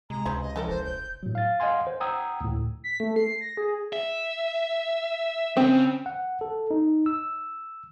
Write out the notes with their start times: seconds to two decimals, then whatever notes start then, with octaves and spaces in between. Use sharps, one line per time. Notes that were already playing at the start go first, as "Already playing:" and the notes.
0.10 C3 G#3 A#5
0.25 C#2 G#4 B4 C5
0.41 D#5
0.56 E3 F3 A4 A#4
0.68 F1 C5
0.84 G6
1.23 A2 F#3
1.35 F5 A6
1.60 D#5 F5 F#5 G#5 C6
1.87 C5
2.00 F#5 G5 A#5 D#6 E6 G#6
2.41 D2 A2
2.84 B6
3.00 A3
3.16 C7
3.41 A#6
3.57 G#4
3.93 E5
5.57 C#3 C4
6.06 F#5
6.41 A4
6.71 D#4
7.06 E6